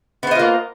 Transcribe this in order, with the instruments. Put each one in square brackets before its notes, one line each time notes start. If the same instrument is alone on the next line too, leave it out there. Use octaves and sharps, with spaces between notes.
[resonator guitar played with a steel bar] B3
C5
D#5
F4
A#3